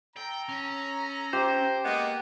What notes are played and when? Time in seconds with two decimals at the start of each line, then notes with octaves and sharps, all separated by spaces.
0.16 A4 G5 A#5
0.49 C#4
1.33 G4 C5
1.84 G#3 A#3 B3